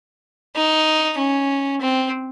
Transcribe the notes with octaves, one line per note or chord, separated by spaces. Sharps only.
D#4
C#4
C4